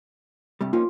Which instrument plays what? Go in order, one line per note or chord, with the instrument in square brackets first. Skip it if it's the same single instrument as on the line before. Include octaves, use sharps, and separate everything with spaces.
[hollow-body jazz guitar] G2 C3 G3
[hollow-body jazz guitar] A#3 C#4 D#4 [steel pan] F4